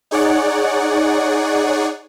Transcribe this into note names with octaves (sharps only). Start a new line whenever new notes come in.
D#4 G#4 C#5 D5 F#5